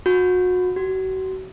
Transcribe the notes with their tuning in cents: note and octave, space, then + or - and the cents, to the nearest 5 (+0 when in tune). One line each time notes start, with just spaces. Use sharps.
F#4 -30
F#4 +35